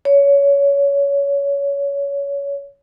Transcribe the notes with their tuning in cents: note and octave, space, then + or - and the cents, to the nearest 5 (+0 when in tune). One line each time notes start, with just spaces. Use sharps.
C#5 +20